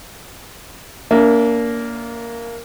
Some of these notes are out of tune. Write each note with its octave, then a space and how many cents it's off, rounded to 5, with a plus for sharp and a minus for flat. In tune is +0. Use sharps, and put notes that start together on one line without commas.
A#3 +0 D4 -40 E5 +0